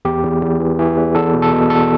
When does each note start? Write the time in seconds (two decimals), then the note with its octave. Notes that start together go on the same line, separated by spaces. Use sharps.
0.05 E2 G4
0.24 E2
0.43 E2
0.60 E3
0.79 E3
0.97 E2
1.15 E2 A4
1.33 B2
1.42 A4
1.52 B2
1.70 E2 A4